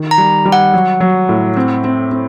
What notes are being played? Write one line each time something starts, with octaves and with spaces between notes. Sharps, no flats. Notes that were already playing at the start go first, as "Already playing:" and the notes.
Already playing: D#3
A#5
G3
G3
F#5
F#3
F#3
A2
C4
C4
C4